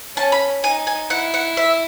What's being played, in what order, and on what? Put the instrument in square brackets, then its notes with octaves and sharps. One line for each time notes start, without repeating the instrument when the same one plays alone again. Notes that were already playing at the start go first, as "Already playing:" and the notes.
[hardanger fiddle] C#4 [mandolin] A5
[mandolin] B5
[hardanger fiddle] D#4 [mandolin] G#5
[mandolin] G#5
[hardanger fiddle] E4 [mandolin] F#5
[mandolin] F#5
E5